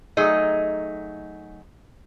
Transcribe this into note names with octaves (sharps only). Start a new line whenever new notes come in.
F#3 A3 D#4 G#4 D#5